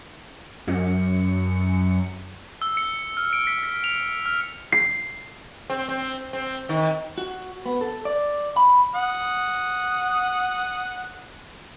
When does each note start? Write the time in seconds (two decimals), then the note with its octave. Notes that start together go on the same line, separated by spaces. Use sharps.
0.68 F#2 C#7
2.62 E6
2.77 C#7
3.17 F6
3.33 D7
3.47 B6
3.63 B6
3.84 F7
4.26 F6
4.72 C7
5.70 C4
5.89 C4
6.33 C4
6.69 D#3
7.18 F#4
7.66 B3
7.81 A4
8.05 D5
8.57 B5
8.95 F#5 D#6